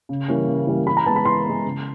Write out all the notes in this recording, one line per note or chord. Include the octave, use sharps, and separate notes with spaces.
C#3
E3 G3 A#3 C#4
C#3
E3 G3 A#3 C#4
E3 B5
A#5
G#3 B3 A5
B5
E3 C6
G#3 B3
C#3